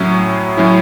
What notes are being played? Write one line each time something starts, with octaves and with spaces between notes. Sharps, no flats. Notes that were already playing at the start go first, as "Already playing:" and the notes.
Already playing: A2 F#3 C#4 E4
A2 F#3 C#4 E4